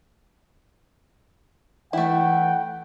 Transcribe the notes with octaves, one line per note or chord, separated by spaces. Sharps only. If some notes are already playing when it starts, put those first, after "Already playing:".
E3 A3 E4 F#5 G5